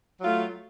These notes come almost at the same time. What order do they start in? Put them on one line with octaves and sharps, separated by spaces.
F#3 F4 A3